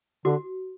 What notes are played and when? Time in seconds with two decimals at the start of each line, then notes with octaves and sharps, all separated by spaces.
0.25 D3 F#4